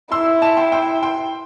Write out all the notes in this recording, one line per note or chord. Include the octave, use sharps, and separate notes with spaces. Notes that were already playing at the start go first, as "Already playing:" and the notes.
E4 C6 E6
E5 A5
G5 C6
G5 C6
G5 C6